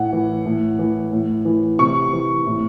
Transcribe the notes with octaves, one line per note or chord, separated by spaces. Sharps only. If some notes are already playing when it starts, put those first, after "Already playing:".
Already playing: A2 F#5
E3
A2
E3
A2
E3
C3 C#6
E3
A2